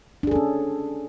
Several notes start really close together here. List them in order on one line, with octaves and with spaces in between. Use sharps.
D4 G#4 A4 C#4